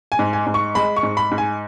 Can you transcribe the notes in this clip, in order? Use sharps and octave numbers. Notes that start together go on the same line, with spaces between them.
G#5
G#2
G#5
G#2
C#6
G#3 B5
C#6
G#2
B5
G#2
G#5